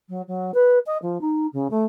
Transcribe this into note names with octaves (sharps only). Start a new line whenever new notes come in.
F#3
F#3
B4
D#5
F3
D#4
C#3
A3